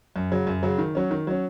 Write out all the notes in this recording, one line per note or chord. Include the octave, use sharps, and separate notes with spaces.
F#2
C#3 F#3
F#2
C#3 F#3
D#3
F#3 C#4
D#3
F#3 C#4